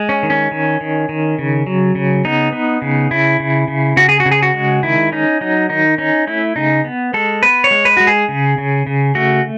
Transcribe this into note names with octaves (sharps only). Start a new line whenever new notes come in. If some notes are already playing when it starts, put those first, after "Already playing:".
Already playing: G#3
C#4
D#3
C#4
D#3
D#3
D#3
C#3
F#3
C#3
B3 D#4
B3
C#3
C#3 E4
C#3
C#3
C#3 F#4
G#4
F#4
C#3
G#4
F#4
G#3
D#3 E4
C#4 D#4
F#3 D#4
D#3 D#4
C#4 D#4
A3 E4
C#3 D#4
B3
G#3 A4
B3 B4
C#5
G#3
B4
G#3 F#4
G#4
C#3
C#3
C#3
A3 F#4